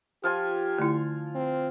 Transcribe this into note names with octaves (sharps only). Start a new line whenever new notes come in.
F3 F4 G4 G#5
D3 A3 E4
C4